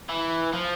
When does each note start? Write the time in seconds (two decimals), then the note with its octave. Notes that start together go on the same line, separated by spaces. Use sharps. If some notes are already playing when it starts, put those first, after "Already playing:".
0.09 E3
0.53 F3